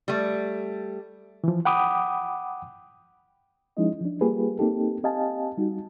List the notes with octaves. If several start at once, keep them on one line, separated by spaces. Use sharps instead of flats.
G3 A3
E3 F3
F#5 G5 B5 D6 D#6
F3 G#3 C#4 D#4 E4 D#5
F3 D4
G3 A#3 F4 G4 G#4 B4
A#3 C4 D#4 G4 A4
C4 G4 D#5 F5 G#5 A5
G3 D#4 F#4